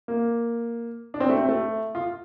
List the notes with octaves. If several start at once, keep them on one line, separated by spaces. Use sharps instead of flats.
A#3
D4
C4
A3
C4
A3
F4